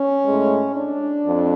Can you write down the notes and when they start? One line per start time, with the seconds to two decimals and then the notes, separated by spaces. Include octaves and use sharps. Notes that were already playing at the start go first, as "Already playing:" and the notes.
Already playing: C#4
0.25 A2 G#3
0.75 D4
1.25 F2